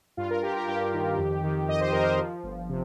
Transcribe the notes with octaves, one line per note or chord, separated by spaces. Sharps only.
G2 F4
A#4
G2 G4
A#4
G2 G4
D#3
F2
D#3
F2 D#5
C5
F2 A#4
C5
F3
G1
C3